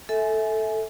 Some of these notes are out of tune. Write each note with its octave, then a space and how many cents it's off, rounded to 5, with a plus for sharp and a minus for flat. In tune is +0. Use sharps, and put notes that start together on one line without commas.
A4 +0 E5 -20 G#5 +20